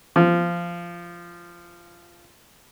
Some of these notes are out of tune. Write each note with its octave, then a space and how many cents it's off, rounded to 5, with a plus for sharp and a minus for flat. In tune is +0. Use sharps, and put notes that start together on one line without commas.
F3 -15